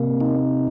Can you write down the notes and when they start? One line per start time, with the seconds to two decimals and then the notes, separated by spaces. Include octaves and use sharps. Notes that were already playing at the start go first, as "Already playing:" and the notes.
Already playing: C3 A#3
0.21 D#4